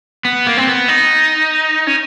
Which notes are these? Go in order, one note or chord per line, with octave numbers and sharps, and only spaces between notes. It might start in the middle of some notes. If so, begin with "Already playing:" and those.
B3
A#3
C4
B3
D#4
C#4